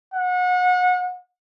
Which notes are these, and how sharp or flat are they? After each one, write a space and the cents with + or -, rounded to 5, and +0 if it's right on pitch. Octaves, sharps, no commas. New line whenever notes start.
F#5 -30